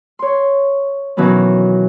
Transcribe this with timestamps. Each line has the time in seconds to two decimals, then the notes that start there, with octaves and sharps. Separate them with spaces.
0.19 C#5 C6
1.17 B2 D#3 E3 F#3 B3 C#4